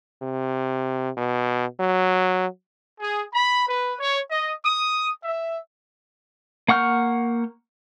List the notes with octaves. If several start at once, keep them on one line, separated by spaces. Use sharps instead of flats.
C3
B2
F#3
G#4
B5
B4
C#5
D#5
D#6
E5
A#3 F#5 C#6 F6 G6